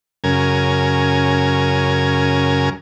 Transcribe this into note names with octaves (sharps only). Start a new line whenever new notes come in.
F#2 C#3 A#4 G#5